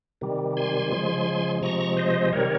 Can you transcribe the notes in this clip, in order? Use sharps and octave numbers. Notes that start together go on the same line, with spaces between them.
C3 D#3 G3
G#5 C6
C#3 F3 G#3
C3 F3 G#3 A#5 C#6
C5 D#5
C3 D#3 G3 A#4 C#5